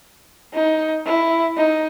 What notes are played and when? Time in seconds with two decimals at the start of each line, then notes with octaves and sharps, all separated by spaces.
0.54 D#4
1.06 E4
1.57 D#4